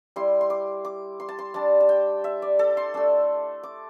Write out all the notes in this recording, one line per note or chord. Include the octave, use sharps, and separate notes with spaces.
G3 E4 C6
C6
D6
D6
C6
A5
C6
G3 D4 A5
A5
G5
E5
D5
A4
C6
A3 D4 E6
D6